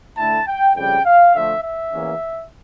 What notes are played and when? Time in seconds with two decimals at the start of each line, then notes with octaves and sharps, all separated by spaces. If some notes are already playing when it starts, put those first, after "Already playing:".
0.17 D3 A3 E4 A5
0.46 G5
0.75 F2 C#3 G3 G5
1.05 F5
1.34 D3 F3 A3 E5
1.62 E5
1.92 E2 E3 A#3 C#4